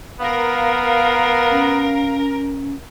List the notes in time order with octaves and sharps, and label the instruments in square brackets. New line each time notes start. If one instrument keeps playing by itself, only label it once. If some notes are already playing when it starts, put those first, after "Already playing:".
[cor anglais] B3 [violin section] A#4 [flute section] F5
[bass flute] C#4